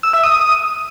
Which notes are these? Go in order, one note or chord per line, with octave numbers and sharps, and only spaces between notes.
E6
E5
D#6
D#6